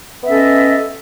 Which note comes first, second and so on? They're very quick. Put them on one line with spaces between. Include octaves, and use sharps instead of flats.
B3 E5 C#4 A4 D#5